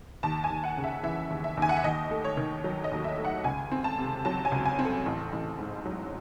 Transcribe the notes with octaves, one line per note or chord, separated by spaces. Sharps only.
D#2 A5
G#5
D#2
F#5
C#3
E5
E3 E5
D#2
E5
D#2
G#5
F#5
E5
D#2 D#5
A3
C#5
D#3
F#3
D#5
D#2
E5
A3
F#5
C#2 G#5
C4
A5
C3
F#3 A5
G#5
C#2
G#5
C4
A4
A1
A1
G#2
F#3